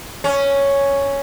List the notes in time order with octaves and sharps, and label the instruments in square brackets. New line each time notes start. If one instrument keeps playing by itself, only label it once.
[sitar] C#4